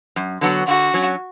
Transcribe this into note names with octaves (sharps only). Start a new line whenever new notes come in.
F#2
D3 F#3 B3 F#4
D3 F#4
F#3 C#4